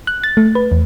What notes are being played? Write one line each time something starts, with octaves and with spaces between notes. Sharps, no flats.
F#6
A6
A3
B4
E2